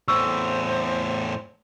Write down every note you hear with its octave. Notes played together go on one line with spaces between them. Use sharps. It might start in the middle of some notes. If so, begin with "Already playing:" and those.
E2 A2 C4 C#6 E6